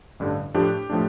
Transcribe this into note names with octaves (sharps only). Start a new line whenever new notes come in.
A1 G2 D3
A2 F3 A3 D4 G4
A2 F3 A3 D4